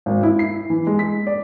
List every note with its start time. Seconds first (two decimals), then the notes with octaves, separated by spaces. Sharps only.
0.06 G#1
0.23 E4
0.39 C7
0.70 E3
0.87 G#3
0.99 B6
1.27 D5